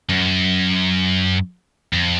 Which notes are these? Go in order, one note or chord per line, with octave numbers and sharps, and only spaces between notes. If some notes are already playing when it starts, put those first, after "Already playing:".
F#2
F2